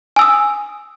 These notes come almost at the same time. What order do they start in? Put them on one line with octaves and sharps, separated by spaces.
G#5 E6 D#6